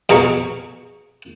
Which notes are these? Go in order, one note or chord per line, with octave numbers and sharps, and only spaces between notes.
F2 B2 G#4 A#5 C#6